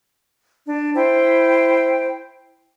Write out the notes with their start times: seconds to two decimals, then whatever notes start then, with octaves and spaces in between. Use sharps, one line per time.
0.65 D4
0.95 E4 C5 G5